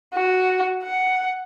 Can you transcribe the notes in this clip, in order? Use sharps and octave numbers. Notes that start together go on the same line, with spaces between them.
F#4
F#5